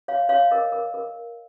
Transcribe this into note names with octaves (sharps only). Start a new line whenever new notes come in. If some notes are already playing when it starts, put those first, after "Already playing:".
C#5 F5
C#5 F5
A#4 D#5
A#4
A#4